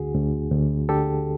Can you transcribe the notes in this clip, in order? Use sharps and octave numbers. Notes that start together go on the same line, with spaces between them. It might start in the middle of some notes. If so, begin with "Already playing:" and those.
Already playing: D2 D3 F#4 G#4
D2
D2
D3 G4 A4